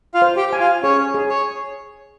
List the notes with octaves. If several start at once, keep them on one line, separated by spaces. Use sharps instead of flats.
F4 F5
C5
G4 G5
G#5
F4 F5
C#4 G#4 C#5
G#4
C#5